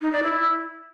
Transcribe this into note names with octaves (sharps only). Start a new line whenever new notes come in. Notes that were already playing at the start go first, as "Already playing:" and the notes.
D#4
D5
E4